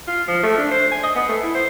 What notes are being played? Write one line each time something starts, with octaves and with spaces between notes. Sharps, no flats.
F4
F3
A3
D4
C5
G#5
D#5
B3
A3
E4
C5